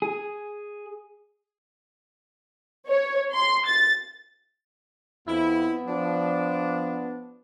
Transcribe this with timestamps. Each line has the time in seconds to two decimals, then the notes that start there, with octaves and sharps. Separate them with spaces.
0.02 G#4
2.88 C#5
3.32 C6
3.66 A6
5.28 F2 B3 E4
5.87 F3 D4